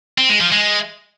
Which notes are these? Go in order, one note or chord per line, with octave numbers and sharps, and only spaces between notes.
C4
G#3
F3
G#3